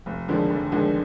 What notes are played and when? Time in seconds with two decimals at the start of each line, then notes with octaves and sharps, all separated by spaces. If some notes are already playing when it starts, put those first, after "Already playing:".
0.06 F1
0.28 D#2 D3 F3 G#3
0.50 F1
0.72 D#2 D3 F3 G#3